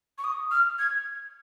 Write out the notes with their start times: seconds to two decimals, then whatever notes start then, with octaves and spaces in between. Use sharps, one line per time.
0.18 C#6
0.24 D#6
0.51 F6
0.79 G#6